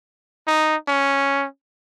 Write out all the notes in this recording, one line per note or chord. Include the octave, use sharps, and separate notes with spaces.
D#4
C#4